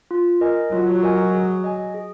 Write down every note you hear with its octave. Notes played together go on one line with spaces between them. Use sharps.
F4
A#4 D#5 G#5
F#3 F4
A#4 D#5 G#5
G#4
D#5 G#5
G#4